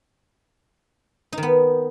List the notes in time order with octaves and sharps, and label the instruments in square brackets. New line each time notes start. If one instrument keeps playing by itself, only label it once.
[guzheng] D#4
D#3
B3